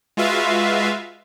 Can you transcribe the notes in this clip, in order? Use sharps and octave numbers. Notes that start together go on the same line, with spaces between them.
G#3 F4 F#4 B4 E5 F5